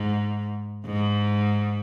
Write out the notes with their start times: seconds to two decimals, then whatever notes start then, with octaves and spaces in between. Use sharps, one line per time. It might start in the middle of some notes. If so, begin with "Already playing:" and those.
Already playing: G#2
0.86 G#2